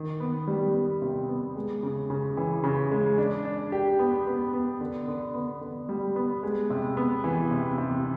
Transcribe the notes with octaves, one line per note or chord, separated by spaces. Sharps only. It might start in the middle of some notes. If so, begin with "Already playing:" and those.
Already playing: D#3
B3
G3
B3
C3
B3
G#3
C#3
C#3
E3
C#3
G#3
D4
D4
G4
B3
B3
B3
D3
D3
B3
D3
G3
B3
G#3
C3
B3
E3
C3
C3